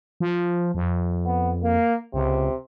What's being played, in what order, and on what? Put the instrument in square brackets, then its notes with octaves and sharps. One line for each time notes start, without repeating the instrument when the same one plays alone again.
[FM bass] F3
F2
[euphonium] B3
A#3
[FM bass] C#2 [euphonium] C3